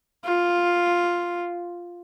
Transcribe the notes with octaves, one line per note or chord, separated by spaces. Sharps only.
F4